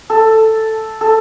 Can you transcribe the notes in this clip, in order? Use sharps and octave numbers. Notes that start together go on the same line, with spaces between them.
A4
A4